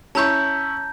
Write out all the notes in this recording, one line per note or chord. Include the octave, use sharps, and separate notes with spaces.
C#4 E4 A5 A#5 C#6 G6